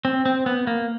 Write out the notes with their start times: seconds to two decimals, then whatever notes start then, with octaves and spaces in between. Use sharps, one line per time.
0.05 C4
0.26 C4
0.46 B3
0.67 A#3